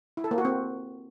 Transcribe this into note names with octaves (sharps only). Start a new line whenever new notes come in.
E4
A4
A#3
F#4
C4